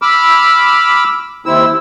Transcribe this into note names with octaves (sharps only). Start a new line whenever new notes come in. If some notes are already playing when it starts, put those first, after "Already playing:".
B5 D6 E6 F6
D#2 C4 E4 E6